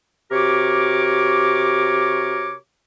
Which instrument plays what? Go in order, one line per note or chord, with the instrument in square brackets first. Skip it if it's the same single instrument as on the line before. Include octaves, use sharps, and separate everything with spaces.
[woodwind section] C3 F#4 G4 A#4 C#5 D6